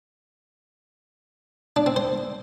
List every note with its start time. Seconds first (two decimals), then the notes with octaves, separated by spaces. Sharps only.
1.76 D4
1.86 C4
1.96 C5